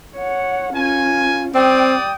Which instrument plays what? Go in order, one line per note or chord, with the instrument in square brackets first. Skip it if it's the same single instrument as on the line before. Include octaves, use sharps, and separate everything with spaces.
[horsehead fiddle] C#5 F#5
[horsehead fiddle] C#4 F4 [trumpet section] A#4 G#5
[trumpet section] G3 D5 D#6 [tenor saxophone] C4 [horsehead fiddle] G5